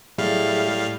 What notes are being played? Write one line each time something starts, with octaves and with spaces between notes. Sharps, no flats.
A2 F#3 G3 G#4 E5 F5